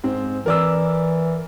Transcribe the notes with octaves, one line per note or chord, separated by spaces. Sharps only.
G#2 C4
E3 A#4 D5 E6